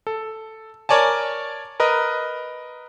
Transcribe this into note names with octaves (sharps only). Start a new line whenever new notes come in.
A4
A#4 C#5 D5 G#5 A5
A#4 B4 D#5